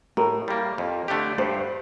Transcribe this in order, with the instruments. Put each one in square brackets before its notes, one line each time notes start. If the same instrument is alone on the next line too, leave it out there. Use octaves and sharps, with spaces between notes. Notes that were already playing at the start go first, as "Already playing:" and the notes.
[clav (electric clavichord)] A2 [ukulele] A#4
[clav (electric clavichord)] G3 A#3
F2
D3 A3 D4 G4
[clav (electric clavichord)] G2 [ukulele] C5